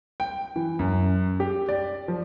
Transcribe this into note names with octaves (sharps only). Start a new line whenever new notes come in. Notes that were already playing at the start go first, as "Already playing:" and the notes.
G5
E3
F#2
G4
D5
F3